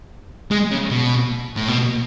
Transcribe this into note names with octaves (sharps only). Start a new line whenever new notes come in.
G#3
C#3
B2
A2
B2